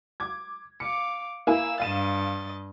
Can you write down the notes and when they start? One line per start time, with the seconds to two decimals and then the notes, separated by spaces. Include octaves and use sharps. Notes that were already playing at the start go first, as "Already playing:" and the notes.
0.20 D6 G#6
0.80 F5 D6 C#7
1.47 A#3 E4 G#5 E6
1.80 G2 D#5 F5 A6 D#7 E7